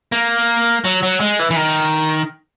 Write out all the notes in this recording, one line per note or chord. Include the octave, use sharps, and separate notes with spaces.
A#3
F#3
F#3
G#3
E3
E3
D#3